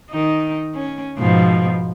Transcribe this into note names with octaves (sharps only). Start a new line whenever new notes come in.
D#3 D#4
C#4
G#2 B2 F3